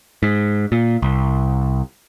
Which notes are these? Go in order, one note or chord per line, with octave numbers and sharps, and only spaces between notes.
G#2
A#2
C2